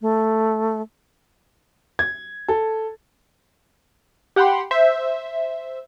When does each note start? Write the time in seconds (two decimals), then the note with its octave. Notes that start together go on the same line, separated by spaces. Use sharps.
0.01 A3
1.99 G#6
2.48 A4
4.36 G4 F#5 G5 B5 C6
4.71 C5 E5